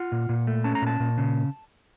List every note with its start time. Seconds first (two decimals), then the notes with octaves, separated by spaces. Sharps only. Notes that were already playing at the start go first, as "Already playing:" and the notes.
Already playing: F4 F#5
0.12 A#2
0.29 A#2
0.47 A3
0.64 C#4 A5
0.75 A#5
0.82 A#2 A5
1.00 A#2
1.18 C#3